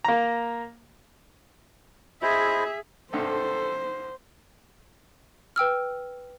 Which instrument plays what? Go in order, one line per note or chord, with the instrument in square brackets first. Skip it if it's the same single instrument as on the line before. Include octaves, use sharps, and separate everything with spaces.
[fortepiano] A#3 A#5
[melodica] E4 C5 D#5 [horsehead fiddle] G#4 E5
[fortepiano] B1 G2 C3 [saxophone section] A4 [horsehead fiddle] C5
[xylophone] B4 G5 E6 F6